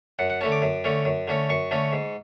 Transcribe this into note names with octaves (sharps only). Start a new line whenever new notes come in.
F#2 F#5
F#5
D3 A3 C#4 A5
D6
F#2
D3 A3 C#4
F#2
D3 A3 C#4
F#2 C#6
D3 A3 C#4
G#2